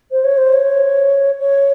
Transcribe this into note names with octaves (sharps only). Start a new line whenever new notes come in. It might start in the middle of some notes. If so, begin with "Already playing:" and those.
C5
C#5
C5
C#5
C#5